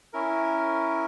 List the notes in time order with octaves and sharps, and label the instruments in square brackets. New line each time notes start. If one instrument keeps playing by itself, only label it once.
[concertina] C#4 E4 A#4